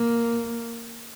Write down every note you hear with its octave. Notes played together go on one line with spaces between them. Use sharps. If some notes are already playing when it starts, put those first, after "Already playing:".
Already playing: A#3